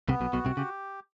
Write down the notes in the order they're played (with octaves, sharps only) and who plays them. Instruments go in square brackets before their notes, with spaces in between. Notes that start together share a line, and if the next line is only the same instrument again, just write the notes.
[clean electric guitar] C2 C3 [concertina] B3
[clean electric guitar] B1 B2
[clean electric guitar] B1 B2 [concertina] F#4
[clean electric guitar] C2 C3
[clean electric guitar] C#3 [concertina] G4